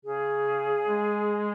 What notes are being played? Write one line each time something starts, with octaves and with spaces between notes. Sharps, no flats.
C#3 G#4
G#3